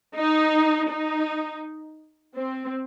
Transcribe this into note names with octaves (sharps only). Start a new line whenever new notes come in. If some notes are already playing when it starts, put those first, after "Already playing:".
D#4
D#4
C4